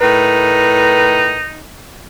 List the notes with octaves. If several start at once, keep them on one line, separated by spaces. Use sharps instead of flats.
A2 D#4 A#4 B4